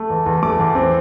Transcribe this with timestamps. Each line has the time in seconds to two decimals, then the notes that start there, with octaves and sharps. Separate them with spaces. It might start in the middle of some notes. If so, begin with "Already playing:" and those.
Already playing: A3
0.10 E2
0.26 E2
0.43 A3 D6
0.59 E2
0.75 C4